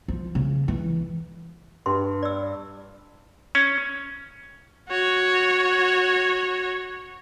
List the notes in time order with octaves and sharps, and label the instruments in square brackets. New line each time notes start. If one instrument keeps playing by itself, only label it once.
[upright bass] F3
C#3
E3
[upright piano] G2 G4 [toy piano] C6
[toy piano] D5 E6
[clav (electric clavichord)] C#4
[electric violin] F#4 C#5